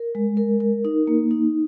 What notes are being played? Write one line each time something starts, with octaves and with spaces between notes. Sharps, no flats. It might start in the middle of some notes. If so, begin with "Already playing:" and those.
Already playing: A#4
G#3
A#4
A#4
D#4
A#3
D#4